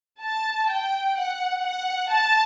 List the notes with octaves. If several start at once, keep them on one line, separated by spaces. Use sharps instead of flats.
A5
G5
F#5
F#5
A5